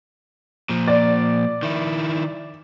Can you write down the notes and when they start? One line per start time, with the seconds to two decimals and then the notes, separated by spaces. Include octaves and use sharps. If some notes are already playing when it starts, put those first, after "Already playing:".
0.69 A#2 F3
0.88 D5
1.63 D#3 E4